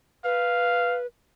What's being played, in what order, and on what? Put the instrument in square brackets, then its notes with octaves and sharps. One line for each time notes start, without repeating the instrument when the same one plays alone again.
[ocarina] B4 [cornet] F5